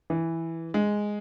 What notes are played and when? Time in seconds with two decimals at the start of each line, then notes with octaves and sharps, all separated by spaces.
0.10 E3
0.74 G#3